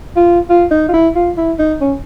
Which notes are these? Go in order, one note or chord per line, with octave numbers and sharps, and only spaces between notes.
F4
F4
D#4
F4
E4
F4
E4
D#4
C#4